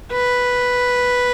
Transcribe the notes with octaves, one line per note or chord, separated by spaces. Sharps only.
B4